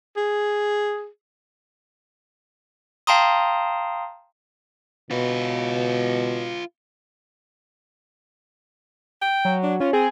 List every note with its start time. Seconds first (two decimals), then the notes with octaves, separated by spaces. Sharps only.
0.17 G#4
3.07 F5 G5 A5 A#5 C6 D#6
5.11 B2 F4 B4
9.22 G5
9.45 F#3
9.63 D4
9.80 C#4 F4
9.93 C4 G#4